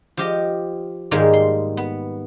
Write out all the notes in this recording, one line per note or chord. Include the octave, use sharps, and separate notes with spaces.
F3 G4 D#5
G#2 D#3 G3 G#3 A#3
C6
B3